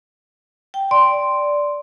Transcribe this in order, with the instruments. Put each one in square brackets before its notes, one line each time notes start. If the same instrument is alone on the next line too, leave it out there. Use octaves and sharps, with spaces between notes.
[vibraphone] G5
[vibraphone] D5 [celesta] C6